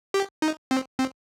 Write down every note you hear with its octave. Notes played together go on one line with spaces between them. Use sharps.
G4
D#4
C4
C4